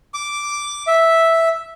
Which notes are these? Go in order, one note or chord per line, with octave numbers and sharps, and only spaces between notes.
D6
E5